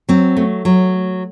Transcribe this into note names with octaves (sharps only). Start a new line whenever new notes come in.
F#3 C4
A3
F#3